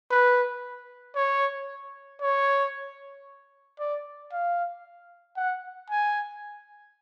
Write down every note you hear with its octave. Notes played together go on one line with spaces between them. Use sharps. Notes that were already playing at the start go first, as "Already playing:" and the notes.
B4
C#5
C#5
D5
F5
F#5
G#5